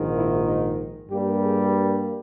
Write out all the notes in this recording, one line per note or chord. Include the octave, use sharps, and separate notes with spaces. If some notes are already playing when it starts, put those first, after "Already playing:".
Already playing: A#1 G#2 D#3
E4
D#4
G2 G3 A#3 G4
G#4